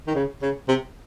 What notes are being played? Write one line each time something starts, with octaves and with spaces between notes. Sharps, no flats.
D#3
C#3
C#3
C3